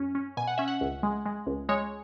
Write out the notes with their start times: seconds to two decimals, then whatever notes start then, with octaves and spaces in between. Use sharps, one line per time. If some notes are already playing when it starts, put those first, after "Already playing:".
Already playing: F#2 C#4
0.15 C#4
0.37 B2 G#5
0.48 F#5
0.58 C#4 E5
0.68 F#5
0.81 C#2
1.03 G#3
1.26 G#3
1.47 C#2
1.69 G#3 C#5